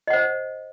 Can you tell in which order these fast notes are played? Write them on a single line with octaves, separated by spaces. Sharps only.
D#5 F#5 C5